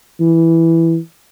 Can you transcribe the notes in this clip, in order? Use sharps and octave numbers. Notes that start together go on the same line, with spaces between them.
E3